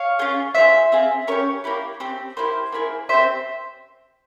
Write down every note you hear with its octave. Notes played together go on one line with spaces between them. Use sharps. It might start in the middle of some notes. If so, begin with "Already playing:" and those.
Already playing: C#5 F5
C#4 F4 G#4
C#4 F4 G#4 C5 E5
C4 F4 G#4
C#4 G4 A#4 C#5
A#3 E4 G4
C4 G4
A#3 E4 G4 C5
A#3 E4 G#4
C4 G4 C5 E5